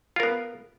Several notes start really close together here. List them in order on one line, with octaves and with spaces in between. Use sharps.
F4 A#4 B3